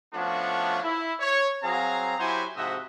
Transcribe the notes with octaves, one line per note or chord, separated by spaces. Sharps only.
F3 A3 B3 C#4 D4 F#4
E4
C#5
F#3 C4 G#4 F5 A#5
F#3 E4 F#4 G4 C5 G#5
G#2 C3 F3 F#4 D#5 E5